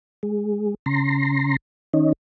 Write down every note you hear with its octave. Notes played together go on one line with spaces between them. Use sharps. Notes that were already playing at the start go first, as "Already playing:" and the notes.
G#3
C#3 A#5 C6
D#3 C#4 D#4